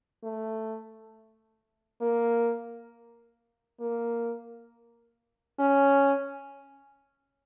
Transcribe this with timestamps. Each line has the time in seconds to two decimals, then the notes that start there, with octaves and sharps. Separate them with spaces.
0.23 A3
2.01 A#3
3.80 A#3
5.59 C#4